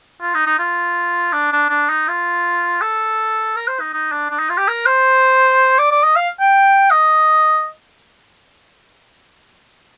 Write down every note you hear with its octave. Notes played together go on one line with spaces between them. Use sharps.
F4
D#4
D#4
F4
D4
D4
D4
D#4
F4
A4
A#4
C5
D#4
D#4
D4
D4
D#4
F4
G4
A#4
C5
D5
D5
D#5
F5
G5
D#5